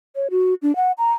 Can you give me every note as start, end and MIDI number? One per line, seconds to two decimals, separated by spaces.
0.16 0.27 73
0.31 0.54 66
0.62 0.75 62
0.76 0.92 78
0.98 1.12 82